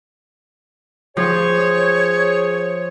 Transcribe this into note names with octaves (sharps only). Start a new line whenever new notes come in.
F3 G#4 C#5